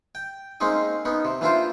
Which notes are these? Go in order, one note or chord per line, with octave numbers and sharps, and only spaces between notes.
G5
G#3 A#3 C4 C#4 D#4 D#5
B3 C#4 D#4
C3
E3 A#3 D4 E4 F4 C5